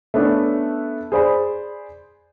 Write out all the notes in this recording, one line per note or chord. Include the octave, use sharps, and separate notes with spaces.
A3 B3 C#4 D4 A4 E5
G#4 C5 D5 B5